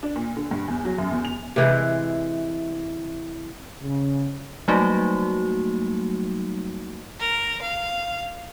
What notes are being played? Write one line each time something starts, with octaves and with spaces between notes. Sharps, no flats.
D4
A#2
D3
G2
E2
F#3
F#2
E2
F7
C3 E3 G#3
C#3
F#3 G3 A3 A#3 D#4 F#4
A#4
F5